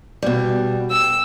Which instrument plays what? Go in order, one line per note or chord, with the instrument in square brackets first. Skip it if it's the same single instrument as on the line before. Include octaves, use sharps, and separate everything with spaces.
[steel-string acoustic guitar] B2 G3
[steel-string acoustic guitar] G5 [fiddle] E6